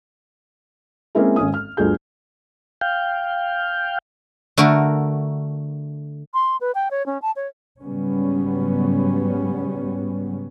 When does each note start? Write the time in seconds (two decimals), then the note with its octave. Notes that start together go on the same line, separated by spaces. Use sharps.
1.15 G#3 A#3 C4 C#4 E4 G#4
1.36 G#1 C#4 D#6
1.54 F6
1.77 G1 D2 F4 G#4 G6
2.81 F5 G5
4.57 D3 A3 F#4 A#4
6.34 C6
6.61 B4
6.75 G5
6.91 C#5
7.06 C#4
7.22 A5
7.36 C#5
7.81 G#2 C#3 F#3 G3 B3 C#4